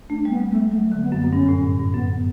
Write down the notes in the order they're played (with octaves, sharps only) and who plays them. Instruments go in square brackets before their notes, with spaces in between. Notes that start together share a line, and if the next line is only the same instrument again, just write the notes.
[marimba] A3 [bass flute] D4
[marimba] G3 [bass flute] B3
[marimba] G3
[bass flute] A3
[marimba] F#3 [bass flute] A3
[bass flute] A3
[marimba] D3
[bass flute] B3
[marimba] F#2
[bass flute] B3
[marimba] F#2
[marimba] G2 [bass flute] C#4
[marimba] A2
G2
G2
[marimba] F#2 [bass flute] B3